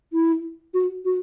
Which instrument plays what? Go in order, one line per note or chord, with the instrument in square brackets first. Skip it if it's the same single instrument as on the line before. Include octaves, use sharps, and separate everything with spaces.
[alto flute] E4
F#4
F#4